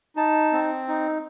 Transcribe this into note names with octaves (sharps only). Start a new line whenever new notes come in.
D#4 A5
C4
D#4